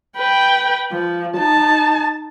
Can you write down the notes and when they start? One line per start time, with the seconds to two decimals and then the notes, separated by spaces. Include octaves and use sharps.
0.17 B4 G5
0.92 F3
1.37 D#4 A5